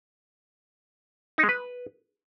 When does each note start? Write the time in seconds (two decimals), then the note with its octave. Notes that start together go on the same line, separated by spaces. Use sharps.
1.38 D#4
1.43 G#3
1.49 B4